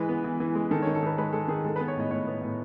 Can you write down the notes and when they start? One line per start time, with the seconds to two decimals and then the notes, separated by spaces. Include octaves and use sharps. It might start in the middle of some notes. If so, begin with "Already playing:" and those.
Already playing: E3 G#3 B4
0.09 B3
0.24 E3
0.40 E3
0.55 G#3
0.71 D#3 A4
0.82 C#5
0.87 D#3
0.95 A4
1.03 D#3 B4
1.18 G#3 B4
1.33 G#3 A4
1.48 D#3 G#4
1.64 G#3 A4
1.76 B4
1.80 B3
1.88 C#5
1.96 A2 D#5
2.11 A2 C#5
2.27 B3
2.42 A2